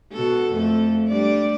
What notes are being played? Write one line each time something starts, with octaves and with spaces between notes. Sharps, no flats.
B2 F#4 A4
F2 A3 A4
G3 D4 D5